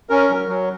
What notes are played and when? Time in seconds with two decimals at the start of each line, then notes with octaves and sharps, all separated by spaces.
0.10 C#4 A#4
0.29 F#3
0.48 F#3